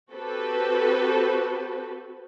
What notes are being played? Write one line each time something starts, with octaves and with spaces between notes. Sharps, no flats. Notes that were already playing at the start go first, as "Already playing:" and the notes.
C4 F#4 G4 A4 B4